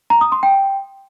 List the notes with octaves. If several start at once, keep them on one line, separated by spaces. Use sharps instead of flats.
A#5
D#6
C6
G5